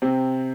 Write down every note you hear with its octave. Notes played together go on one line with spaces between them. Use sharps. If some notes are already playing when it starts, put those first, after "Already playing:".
C3 C4